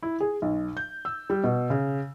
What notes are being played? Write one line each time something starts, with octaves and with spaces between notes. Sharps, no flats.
E4
G#4
B1
G6
E6
G3
B2
C#3